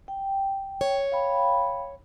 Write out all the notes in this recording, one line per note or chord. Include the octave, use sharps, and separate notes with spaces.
G5
C#5
F5 G5 B5